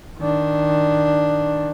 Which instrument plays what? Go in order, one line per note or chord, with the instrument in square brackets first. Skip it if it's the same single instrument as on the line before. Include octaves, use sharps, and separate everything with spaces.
[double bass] D#3 D4